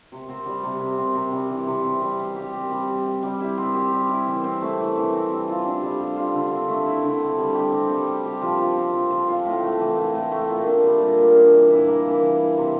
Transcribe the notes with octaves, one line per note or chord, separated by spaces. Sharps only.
C3
C4
G3
C3
C3
C4
C3
G3
E3
C3
C3
G3
G3
G4
C4
G3
G3
G4
G3
E4
C4
G4
G3
E4
E3
C4
A3
E3
E3
C4
G3
F4
D4
G3
G3
F4
D3
C4
A3
E4
D3
C4
G3
G4
C4
G3
G3
G4
F3
F4
C4
F3
F3
F4
A2
A3
E3
A2
A2
A3
A#2
D4
G3
A#2
A#2
D4
E3
E4
A#3
E3
E3
E4
C3